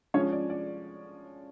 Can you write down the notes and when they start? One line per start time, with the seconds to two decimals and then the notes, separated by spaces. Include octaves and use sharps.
0.14 F3 G#3 C#4 C#5
0.32 D5
0.50 D5